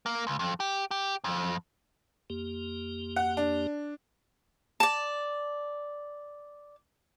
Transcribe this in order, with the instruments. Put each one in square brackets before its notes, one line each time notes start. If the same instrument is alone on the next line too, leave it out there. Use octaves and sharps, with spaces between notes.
[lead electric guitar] A#3
C#2
F2
G4
G4
F2
[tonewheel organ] F2 A#3 G4
[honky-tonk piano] F#5
D4
[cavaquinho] D5 A5